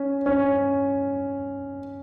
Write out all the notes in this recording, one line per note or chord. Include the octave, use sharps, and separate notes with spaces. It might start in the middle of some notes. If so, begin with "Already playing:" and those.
Already playing: C#4
C#4